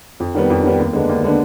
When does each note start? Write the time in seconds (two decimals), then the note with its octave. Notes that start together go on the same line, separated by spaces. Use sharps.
0.20 F2
0.35 D#3 G3 B3
0.50 F2
0.64 D#3 G3 B3
0.79 D#2
0.93 D3 G#3 B3 D4
1.09 D#2
1.24 D3 G#3 B3 D4